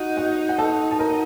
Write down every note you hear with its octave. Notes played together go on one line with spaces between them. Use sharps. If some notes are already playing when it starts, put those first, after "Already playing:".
Already playing: D#4 F#4 F#5
F#4 F#5
F#5
A4 A5
A5
A#4 A#5